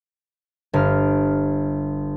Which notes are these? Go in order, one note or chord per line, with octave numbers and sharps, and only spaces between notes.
G1 F6